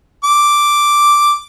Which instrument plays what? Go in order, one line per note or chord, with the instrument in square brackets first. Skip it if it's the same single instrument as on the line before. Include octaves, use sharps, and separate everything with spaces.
[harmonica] D6